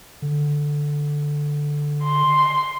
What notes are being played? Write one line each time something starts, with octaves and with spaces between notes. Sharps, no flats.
D3
C6